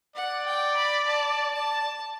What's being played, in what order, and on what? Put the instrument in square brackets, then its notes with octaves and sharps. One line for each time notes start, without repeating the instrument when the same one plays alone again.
[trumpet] D5 [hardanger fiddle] F#5
[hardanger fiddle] G5
B5
A5
A5